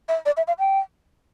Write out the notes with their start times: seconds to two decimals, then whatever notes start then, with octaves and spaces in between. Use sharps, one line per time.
0.09 E5
0.26 D5
0.37 E5
0.48 F5
0.59 G5